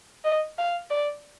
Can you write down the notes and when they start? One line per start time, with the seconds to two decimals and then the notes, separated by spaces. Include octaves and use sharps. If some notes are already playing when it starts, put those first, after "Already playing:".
0.24 D#5
0.58 F5
0.90 D5